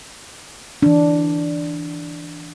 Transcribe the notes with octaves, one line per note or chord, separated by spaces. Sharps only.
E3 D4